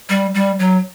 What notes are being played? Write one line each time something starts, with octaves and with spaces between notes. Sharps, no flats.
G3
G3
F#3